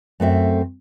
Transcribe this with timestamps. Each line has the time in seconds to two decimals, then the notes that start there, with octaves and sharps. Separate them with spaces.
0.20 F#2 A3 C4 E5